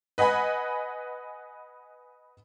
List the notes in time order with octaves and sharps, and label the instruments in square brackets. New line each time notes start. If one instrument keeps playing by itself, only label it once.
[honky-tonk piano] B4 D#5 F#5 G#5 B5